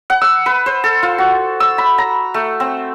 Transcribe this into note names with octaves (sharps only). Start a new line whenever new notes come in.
F#5
E6
B4
C5
A4
F4
F#4
E6
B5
A#5
A3
C4